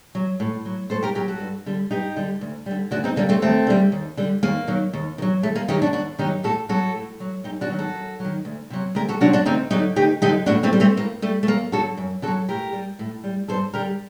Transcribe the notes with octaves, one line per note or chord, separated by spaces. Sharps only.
F#3
A2
F#3
A2 A4 C5
G4 A#4
F#3 G4 A#4
F#4 A4
G2
D3 G3
G2 D#4 G4
D3 G3
D2
D3 G3
D2 D4 F#4
C4 D#4
D3 G3 A#3 D4
A3 C4
D#2 A3 C4
D3 G3
D#2
D3 G3
D#2 A#3
D#3 F#3
D#2
D#3
F#3
D#2 A3
A#3
D#3 F#3 D#4 G4
D4 F#4
D#2 D4 F#4
D#3 F#3 D#4 G4
A2 F#4 A4
F#3 F#4 A4
A2
F#3
F#2 D#4 G4
D4 F#4
D#3 F#3
F#4 A4
F#2
D#3 F#3
D2
C3 F#3
D2 G4 A#4
F#4 A4
C3 F#3 D4 F#4
D4 F#4
D2 C4 D#4
D3 F#3 D#4 G4
D2 D#4 G4
D3 F#3 D#4 G4
A2 D4 F#4
A3 C4
G3
A3 C4
A2 A#3
G3 A3
A3
F#2 A#3
D3 F#3 F#4 A4
F#2
D3 F#4 A4
F#3
A2 G4 A#4
G3
A2
G3
G2 A4 C5
D3 G3 G4 A#4